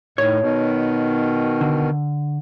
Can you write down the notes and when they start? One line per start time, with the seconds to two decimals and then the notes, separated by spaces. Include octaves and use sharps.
0.18 A2 D#3 C#5
0.40 B2 D#3
1.61 D3